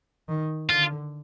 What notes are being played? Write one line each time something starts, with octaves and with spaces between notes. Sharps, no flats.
D#3
D3 F4